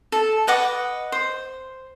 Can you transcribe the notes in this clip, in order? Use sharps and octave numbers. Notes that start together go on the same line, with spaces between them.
A4
B4 D#5 F#5 D6
C5